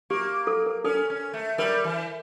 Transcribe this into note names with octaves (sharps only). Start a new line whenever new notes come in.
A#3 G4
A4
A#4
C#4 A4
C#4
A3
G3 A#4
E3